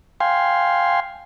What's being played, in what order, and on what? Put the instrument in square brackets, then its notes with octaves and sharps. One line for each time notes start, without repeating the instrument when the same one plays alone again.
[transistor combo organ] F5 G5 G#5 C6